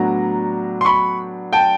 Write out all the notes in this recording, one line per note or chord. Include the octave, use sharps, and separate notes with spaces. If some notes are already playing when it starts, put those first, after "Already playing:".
Already playing: A2 F#3 B3 D4 A#5
C6
B5 C#6
G5 A5